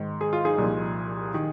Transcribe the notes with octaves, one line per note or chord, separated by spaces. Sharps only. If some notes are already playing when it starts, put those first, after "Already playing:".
Already playing: G#2 D#3
G#4
F4
D#4 G#4
C2 A#2 F3
D#3